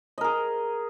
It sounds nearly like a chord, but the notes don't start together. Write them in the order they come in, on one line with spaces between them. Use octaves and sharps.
D#5 A#4 G#4